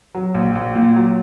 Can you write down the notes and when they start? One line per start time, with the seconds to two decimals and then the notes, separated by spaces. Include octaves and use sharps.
0.15 F#3
0.34 A#1
0.55 A#1
0.75 A#2
0.96 F#3